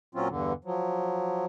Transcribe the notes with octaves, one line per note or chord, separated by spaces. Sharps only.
A#2 F#3 C4 C#4 F4
E2 G2 D3
F3 F#3